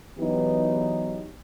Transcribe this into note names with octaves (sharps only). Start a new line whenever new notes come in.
E3 F#3 B3 D#4 G4